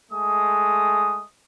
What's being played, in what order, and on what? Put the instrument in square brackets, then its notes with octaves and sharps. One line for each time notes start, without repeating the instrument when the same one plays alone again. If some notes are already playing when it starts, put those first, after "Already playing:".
[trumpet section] G#3 A3 D#6